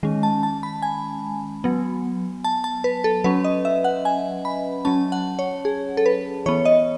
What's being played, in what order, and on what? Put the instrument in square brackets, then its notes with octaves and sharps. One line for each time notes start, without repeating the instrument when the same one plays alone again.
[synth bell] D#3 G#3 C#4
A5
A5
B5
G#5
F#3 B3
A5
A5
B4
A4
F#3 C#4 B4
D#5
E5
F#5
G#5
B5
F#3 C#4 A5
F#5
C#5
G#4
A4
B4
E3 B3 C#5
D#5